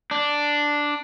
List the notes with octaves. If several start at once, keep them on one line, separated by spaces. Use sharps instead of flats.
D4